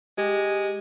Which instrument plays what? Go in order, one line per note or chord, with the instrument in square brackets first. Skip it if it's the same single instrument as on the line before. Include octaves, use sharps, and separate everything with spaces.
[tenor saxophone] G#3 [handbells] G4